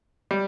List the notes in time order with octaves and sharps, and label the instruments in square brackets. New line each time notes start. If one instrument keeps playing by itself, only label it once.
[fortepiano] G3